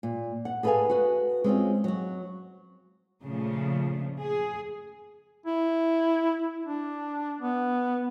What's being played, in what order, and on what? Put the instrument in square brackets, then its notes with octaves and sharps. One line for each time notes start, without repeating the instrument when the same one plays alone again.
[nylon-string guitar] A#2
F#5
G#4 A4 B4 D#5 F5 G#5
F#4 B4
G#3 C4 C#4 F4
F#3 F#4
[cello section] A#2 C#3 F3 A3
G#4
[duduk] E4
D4
B3